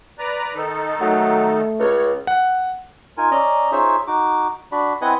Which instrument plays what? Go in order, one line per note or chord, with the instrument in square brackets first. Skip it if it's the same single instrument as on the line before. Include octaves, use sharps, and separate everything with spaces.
[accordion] B4 D5 A#5
D#3 D#4 A4
[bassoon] F#3 [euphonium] A3
[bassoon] C#2 [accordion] C#5
[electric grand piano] F#5
[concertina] D#4 F4 A#4 G#5
C#4 D5 D#5 A#5
D#4 F4 G#4 C5 C#5 E5
D#4 F#4 D6
D4 F#4 D5 B5
C4 E4 B4 D#5 F#5 G#5